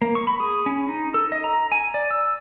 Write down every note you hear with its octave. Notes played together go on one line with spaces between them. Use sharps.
A#3
C#6
B5
G#4
C#4
D#4
A4
D#5
A#5
G#5
D5
E6